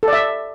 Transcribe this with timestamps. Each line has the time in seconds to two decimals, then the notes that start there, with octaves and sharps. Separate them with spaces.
0.03 A4
0.08 D5
0.13 E5